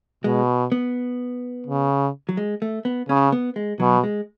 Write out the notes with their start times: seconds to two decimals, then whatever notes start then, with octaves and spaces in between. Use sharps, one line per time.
0.24 B2 G#3
0.72 B3
1.67 C#3
2.29 F#3
2.37 G#3
2.62 A3
2.85 B3
3.09 C#3 C#4
3.32 B3
3.56 G#3
3.80 B2 F#3
4.04 G#3